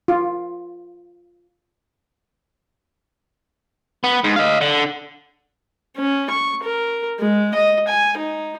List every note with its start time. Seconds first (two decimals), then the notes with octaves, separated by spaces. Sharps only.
0.08 F4
4.04 B3
4.24 G#2
4.36 D#5 F5
4.61 D3
5.97 C#4
6.30 C#6
6.64 A#4
7.20 G#3
7.54 D#5
7.88 G#5
8.17 D#4